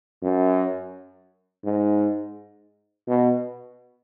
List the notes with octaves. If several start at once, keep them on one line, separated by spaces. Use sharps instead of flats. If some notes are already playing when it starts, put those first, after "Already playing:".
F#2
G#2
B2